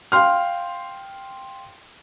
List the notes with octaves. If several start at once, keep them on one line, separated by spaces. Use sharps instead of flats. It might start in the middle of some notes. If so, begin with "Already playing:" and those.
F5 G5 C6 F6